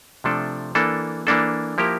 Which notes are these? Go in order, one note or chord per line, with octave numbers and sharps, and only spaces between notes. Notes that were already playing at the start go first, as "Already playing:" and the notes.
C3 F3 A3 D4 A4
E3 A#3 D4 A4
E3 A#3 D4 A4
F3 A#3 E4 G4 A#4